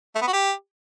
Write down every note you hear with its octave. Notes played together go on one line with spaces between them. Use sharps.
A3
B3
F#4
G4